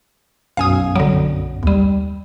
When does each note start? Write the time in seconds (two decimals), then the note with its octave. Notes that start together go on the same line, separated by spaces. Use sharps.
0.57 B1 F#2 F5 G#5 D#6
0.96 D3 F#3
1.63 D#2 G3